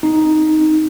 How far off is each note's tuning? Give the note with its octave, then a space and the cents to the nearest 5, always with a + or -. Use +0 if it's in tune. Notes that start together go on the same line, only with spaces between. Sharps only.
C4 +0 D#4 +0